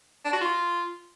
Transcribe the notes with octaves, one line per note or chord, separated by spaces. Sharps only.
D4
F#4
F4